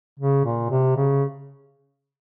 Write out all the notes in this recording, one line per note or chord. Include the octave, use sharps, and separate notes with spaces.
C#3
A#2
C3
C#3